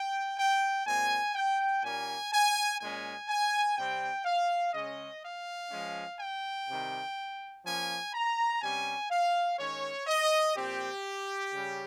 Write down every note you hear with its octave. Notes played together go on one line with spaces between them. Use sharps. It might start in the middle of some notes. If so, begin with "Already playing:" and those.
Already playing: G5
G5
A#2 G#3 C4 G#5
G5
A#2 G3 A#3 C#4 G#5
G#5
A#2 G#3 C#4 G#5
G#5
C3 G3 C4 G5
F5
C#3 G#3 C#4 D#5
F5
F3 G#3 C#4
G5
C3 D#3 G3
F3 A#3 C#4 G#5
A#5
C3 G3 C#4 G#5
F5
D#3 G#3 C#4 C#5
D#5
A#2 F3 C4 G4
C#3 G3 C#4